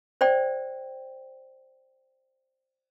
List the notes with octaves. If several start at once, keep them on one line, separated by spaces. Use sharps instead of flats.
C5 D5 G5